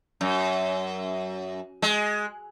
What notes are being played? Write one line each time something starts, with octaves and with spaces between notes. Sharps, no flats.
F#2
G#3